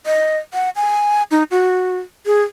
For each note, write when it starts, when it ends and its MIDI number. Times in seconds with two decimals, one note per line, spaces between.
0.06 0.37 75
0.53 0.70 78
0.76 1.23 80
1.31 1.43 63
1.51 1.97 66
2.26 2.41 68